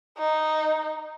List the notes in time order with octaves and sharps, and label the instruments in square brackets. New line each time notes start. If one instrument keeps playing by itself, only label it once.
[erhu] D#4